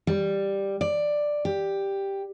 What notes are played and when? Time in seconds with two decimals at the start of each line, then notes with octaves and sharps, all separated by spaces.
0.07 G3
0.81 D5
1.45 G4